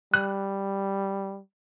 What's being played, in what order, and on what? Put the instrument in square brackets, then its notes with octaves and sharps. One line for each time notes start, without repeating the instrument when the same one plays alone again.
[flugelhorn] G3 [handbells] F#6